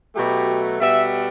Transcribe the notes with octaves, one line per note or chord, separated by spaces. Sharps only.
B2 F#3 A3 G4
B2 G3 B3 E5